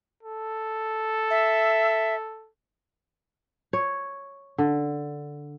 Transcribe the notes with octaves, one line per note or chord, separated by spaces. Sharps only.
A4
E5
C#5
D3